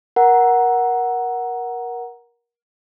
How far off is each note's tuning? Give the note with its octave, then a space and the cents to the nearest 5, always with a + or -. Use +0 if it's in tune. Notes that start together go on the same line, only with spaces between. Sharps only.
A#4 +25 F#5 +0 A#5 +10